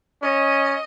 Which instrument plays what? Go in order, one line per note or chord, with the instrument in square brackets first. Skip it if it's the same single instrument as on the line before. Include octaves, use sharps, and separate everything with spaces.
[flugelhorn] C#4 [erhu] D#5